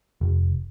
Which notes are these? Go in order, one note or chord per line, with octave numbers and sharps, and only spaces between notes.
F1